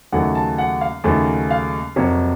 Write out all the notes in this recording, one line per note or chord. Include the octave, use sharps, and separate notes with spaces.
D#2 C#3 F#3 A3 F#5
A5
F#5
F5
D#2 C#3 F#3 A3
F5
F2 C3 F#3 A#3 C#5